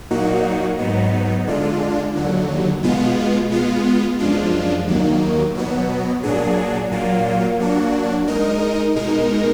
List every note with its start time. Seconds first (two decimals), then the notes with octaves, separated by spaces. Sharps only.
0.10 A#2 F#3 A#3 D#4 F#4
0.79 G#2 F#3 B3 D#4
1.47 D3 G#3 D4 F4
2.15 D#2 D3 F#3
2.83 B2 G#3 B3 F4
3.51 G#3 B3 F4
4.19 F#2 F3 G#3 D4 F4
4.87 D#2 D#3 F#3 A#3
5.55 B2 F#3 B3
6.23 A#2 F#3 D4 G#4
6.91 A#2 F#3 A#3 F4
7.60 F#3 A#3 D4 F#4
8.28 G#3 D#4 A#4 D#5
8.96 B2 G#3 D#4 A#4